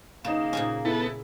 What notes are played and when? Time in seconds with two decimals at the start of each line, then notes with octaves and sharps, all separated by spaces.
0.25 C#3 A#3 D#4 E7
0.53 A#2 C#3 C#4
0.85 B3 E4 A4